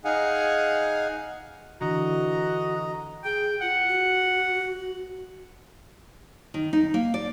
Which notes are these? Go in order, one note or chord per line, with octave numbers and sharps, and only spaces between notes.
D#4 G#4 F5 F#5 G#5
D3 E3 F#4 D#5 A#5
G#4 G5
F4 F#5
F#4
D#3
D#4
A#3
D5